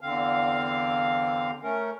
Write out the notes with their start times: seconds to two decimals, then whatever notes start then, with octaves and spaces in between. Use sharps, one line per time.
0.01 E2 D3 C4 F5
1.63 A3 C#4 A#4